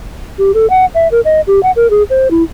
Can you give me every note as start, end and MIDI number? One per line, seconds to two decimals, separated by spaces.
0.38 0.51 67
0.54 0.69 69
0.70 0.85 78
0.95 1.08 76
1.11 1.20 70
1.25 1.41 75
1.47 1.62 67
1.63 1.71 78
1.76 1.90 70
1.90 2.03 68
2.10 2.31 72
2.31 2.43 64